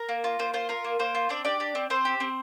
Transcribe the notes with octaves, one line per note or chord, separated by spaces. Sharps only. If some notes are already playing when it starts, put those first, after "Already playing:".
Already playing: A#4 A#5
A#3
F4
A#3 C5
F4 C5
F4 A#4
A#3
A#3 C5
F4
C4 D4 D5
D4 G4 D5
G4
C4
C4 C5
G4
C4